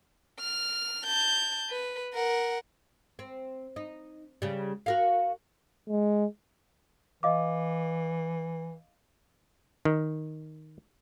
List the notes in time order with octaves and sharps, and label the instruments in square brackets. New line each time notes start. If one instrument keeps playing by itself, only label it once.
[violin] F6
A5 G6
B4
A#4 F#5
[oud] C4
D#4
C#3 G3
F#4 A#4 F5
[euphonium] G#3
[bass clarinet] E3 [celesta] D#5 F5 D6
[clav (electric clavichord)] D#3